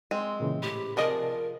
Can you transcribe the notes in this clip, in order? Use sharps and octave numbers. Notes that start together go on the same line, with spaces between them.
G#3 C4
A#2 C#3 E3
A2 G4 B5
C3 F3 G#4 A#4 D5 D#5 A5